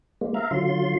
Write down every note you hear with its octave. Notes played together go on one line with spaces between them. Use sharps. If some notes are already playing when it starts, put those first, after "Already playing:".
G#3 A#3
E5 F5 A#5
D3 F#3 F4 C6